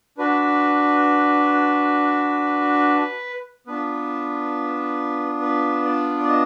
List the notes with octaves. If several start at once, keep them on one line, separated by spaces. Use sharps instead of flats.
D4 F#4 B4
B3 D4 F4 B4
B4
D5
D5
D#5